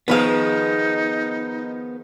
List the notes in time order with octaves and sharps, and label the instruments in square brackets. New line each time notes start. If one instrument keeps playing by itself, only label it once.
[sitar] D#3 F3 G#4 [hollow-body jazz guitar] B3 B4 F5 [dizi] D#4